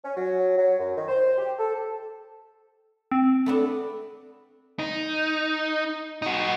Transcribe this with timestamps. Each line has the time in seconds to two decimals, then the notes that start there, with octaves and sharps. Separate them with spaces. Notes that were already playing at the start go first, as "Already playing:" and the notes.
0.03 C#4
0.17 F#3
0.56 F#3
0.79 F#2
0.96 D#3
1.08 C5
1.38 G4
1.58 A4
3.12 C4
3.46 A3 B3 D4
4.79 D#4
6.22 D#4 F#4